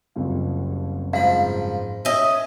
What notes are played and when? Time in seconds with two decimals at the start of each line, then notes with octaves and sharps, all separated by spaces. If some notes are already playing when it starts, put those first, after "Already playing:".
0.16 F#1 C2 F4
1.13 G#2 F3 F5 B5
2.05 C#4 D#5 E5